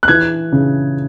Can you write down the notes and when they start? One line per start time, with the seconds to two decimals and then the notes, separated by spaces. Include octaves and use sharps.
0.03 F#6
0.08 E3 G#6
0.52 C#3